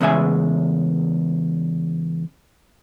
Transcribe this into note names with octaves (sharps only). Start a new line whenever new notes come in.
E2 C#3 G#3 E5 G#5